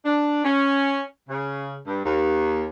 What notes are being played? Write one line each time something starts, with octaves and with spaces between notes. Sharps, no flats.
D4
C#4
C#3
G2
D#2